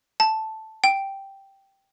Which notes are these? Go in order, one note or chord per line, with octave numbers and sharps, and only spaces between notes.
A5
G5